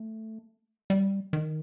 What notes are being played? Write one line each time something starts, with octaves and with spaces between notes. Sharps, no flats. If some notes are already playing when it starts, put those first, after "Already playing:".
Already playing: A3
G3
D#3